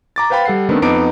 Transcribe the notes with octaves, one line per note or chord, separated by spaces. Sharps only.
A#5 D6 A6
B4 C5 F5 G5 B5 A6
G3 A4 F#5 C7
D#3 A3 B3 C4 D4
F2 B3 D#4 D6 D7